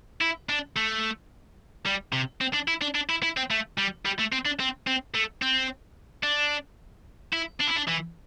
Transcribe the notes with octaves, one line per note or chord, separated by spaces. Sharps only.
E4
D4
A3
G3
C3
C4
D4
E4
D4
D4
E4
E4
C4
A3
G3
G3
A3
C4
D4
C4
C4
A3
C4
D4
E4
D4
E4
D4
E3